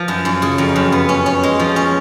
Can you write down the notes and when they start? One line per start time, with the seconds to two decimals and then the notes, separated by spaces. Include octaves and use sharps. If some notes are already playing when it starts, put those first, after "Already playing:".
Already playing: F3
0.08 F#2
0.25 F#2
0.42 C#3
0.58 F2
0.76 F#2
0.92 B3
1.09 C#4
1.26 C#4
1.43 G#3
1.60 F3
1.76 C#4